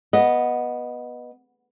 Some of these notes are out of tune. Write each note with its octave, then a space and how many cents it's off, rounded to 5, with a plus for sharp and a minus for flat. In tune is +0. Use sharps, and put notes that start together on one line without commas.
B3 -10 D#5 +0